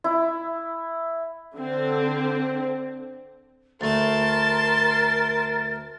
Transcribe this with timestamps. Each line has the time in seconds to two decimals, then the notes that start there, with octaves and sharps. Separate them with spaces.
0.04 E4
1.55 D3 C4
3.81 D2 A3 A#4 A5 C6 A6